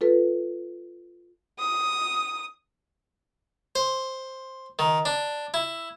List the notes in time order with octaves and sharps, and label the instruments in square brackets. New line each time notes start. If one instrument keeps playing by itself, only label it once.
[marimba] F4 A4 B4
[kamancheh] D#6
[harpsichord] C5
D#3
D4
E4